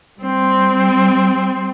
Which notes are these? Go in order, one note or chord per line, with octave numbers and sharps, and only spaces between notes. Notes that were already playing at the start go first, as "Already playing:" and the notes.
G3 C4